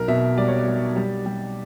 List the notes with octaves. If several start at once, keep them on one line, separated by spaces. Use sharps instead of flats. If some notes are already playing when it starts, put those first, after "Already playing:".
Already playing: B1 A#4
B2 E5
G3 D5
C#5
D5
G3
G3
G3